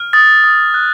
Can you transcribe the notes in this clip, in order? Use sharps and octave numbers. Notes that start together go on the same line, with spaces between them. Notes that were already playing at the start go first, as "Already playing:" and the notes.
Already playing: F6
D#6 A6
D#6
F#6